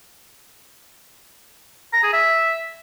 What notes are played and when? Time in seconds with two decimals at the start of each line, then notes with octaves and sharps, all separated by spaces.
1.93 A#5
2.03 G#4
2.13 E5